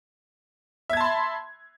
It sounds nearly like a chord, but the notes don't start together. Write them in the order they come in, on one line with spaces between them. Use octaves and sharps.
E5 G#6 A5 C6 B5